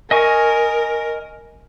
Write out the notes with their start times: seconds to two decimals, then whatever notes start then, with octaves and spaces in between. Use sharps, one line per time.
0.11 A#4 D#5 G#5 C#6